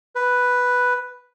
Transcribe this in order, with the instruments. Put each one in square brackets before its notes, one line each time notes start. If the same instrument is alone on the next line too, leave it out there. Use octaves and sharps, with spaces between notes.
[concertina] B4